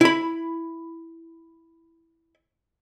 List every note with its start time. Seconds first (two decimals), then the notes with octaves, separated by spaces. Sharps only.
0.01 E4 B5